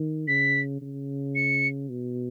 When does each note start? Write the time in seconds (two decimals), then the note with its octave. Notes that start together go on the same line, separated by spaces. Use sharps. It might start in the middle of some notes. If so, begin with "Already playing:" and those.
Already playing: D#3
0.28 C#3 B6
0.81 C#3
1.35 C#7
1.90 B2